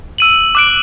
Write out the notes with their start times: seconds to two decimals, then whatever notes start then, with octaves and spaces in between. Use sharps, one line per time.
0.18 E6 D#7 F#7
0.55 D6 F#6 D7